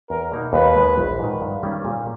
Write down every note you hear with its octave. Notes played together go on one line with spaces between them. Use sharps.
E2 A#4
B2 A#3 D#4
D#2 B4
D#3 G#3 B3
A#1
G#2 D#3
G2
D#3 G3 A#3 C#4
A#2